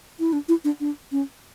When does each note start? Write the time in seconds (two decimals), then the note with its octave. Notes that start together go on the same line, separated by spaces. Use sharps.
0.20 E4
0.33 D4
0.49 E4
0.64 D4
0.80 D4
1.12 C#4